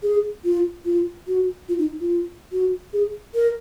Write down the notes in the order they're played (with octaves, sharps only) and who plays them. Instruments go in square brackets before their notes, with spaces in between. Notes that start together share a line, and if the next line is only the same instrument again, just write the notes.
[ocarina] G#4
F4
F4
F#4
F4
D#4
F4
F#4
G#4
A#4